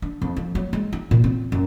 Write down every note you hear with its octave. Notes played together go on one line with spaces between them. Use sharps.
D4
F2
F3
F#3
G#3
D#4
A#2
C4
F#2